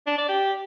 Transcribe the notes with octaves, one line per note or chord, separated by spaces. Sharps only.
D4
D5
G4